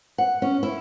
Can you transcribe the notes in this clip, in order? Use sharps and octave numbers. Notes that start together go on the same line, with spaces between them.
F#5
C#4
E4